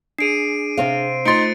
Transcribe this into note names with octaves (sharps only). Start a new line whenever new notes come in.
D4 G#4 C7 D7 D#7
C3 C4 F5
A3 D#4 F4 C5 C6 A6 C#7 D7